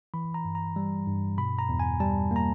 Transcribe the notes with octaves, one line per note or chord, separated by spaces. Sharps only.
E3 B5
A#5
G2
A#5
G3
G2
B2 B5
A#5
E2
G#5
G3 A5
A#3 A#5